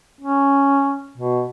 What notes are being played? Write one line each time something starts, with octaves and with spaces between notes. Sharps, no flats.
C#4
B2